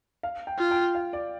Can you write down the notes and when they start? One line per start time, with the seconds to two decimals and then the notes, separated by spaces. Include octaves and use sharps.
0.23 F5
0.47 G5
0.59 F4
0.71 G5
0.95 F5
1.13 D5